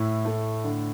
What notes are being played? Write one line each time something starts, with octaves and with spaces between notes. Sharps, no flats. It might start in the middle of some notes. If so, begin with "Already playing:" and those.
Already playing: A2 E4
A3
D3